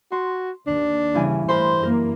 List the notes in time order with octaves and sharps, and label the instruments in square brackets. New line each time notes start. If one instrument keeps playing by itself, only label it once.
[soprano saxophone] F#4 [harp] C6
[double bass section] D#2 [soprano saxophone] D4
[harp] G2 E3 G#5 [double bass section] C#3
[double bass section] A2 [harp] A#4 B5 C6 [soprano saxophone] C5
[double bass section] F#2 A#3 [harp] A#4